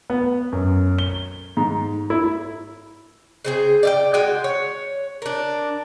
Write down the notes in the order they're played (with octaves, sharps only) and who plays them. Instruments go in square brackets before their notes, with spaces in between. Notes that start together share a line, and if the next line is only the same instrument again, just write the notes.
[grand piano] B3
F#2
G7
G#2
E4
[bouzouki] C#3 C4 G#4
D5 E5 G5
G#3 F#4 G5 G#5
C#5
D4 A#4